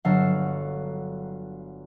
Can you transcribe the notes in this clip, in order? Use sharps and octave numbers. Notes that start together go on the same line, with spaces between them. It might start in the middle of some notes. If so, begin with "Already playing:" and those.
G1 F#3 A4 F5 F#5